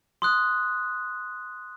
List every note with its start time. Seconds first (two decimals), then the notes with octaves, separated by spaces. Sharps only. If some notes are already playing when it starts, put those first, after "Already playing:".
0.22 C6 D#6 F#6